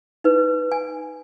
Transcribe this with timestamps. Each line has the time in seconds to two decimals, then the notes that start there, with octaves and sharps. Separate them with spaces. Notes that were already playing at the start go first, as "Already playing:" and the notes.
0.24 D#4 B4
0.72 G#5